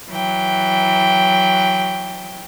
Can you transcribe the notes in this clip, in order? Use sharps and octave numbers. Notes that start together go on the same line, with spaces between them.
E3 F#3 G5